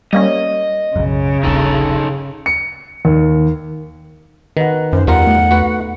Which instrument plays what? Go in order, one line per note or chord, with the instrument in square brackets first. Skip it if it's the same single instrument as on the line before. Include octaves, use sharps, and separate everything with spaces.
[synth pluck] G3 A#3 C#4 [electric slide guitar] D#5
[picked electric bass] B1 F#2 [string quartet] C#3
[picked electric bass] D#1 A#1 G2 [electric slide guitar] D#4 A4
[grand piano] C#7
D#2
[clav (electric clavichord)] D#3 [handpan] B4 F#5
[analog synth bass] F#2 [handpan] D#4 [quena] C5
[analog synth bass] E2 [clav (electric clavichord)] G3 F4 A#4 [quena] F#5
[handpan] A3
[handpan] A3 [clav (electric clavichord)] F#4 B4